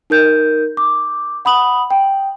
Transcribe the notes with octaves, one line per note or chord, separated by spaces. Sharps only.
D#4 A#4 G6
D6
F#5 B5 D#6 F#7
G5